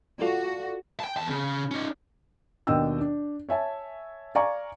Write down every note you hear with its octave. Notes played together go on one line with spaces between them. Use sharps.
F4 F#4 A4 D5
G5 A5
E2 A5
C#3
C#4 D#4
D#2 B2 D4 D#5 G5 E6
D4
C#5 E5 G#5 A5
D5 F5 G#5 A#5 C#6